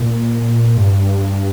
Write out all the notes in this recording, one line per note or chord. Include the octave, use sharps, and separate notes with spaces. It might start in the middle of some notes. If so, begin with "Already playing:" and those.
Already playing: A#2
G2